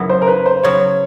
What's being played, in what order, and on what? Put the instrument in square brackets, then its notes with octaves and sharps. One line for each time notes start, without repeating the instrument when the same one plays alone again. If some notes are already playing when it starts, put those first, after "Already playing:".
Already playing: [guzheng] F#2 C#3 F#3 B3 E4
[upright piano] C5
A#4
B4
C5
[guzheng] C#3 F#3 B3 [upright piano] C#5